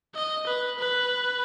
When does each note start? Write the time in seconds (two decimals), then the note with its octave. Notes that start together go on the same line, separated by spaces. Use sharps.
0.15 D#5
0.47 B4
0.79 B4